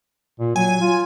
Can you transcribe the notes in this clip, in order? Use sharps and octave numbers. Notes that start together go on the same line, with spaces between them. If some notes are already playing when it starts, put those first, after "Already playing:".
A#2
F#3 G#5
F4